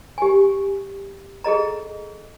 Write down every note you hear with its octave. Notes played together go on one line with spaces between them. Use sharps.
G4 G#5
G#4 A4 D#5 A#5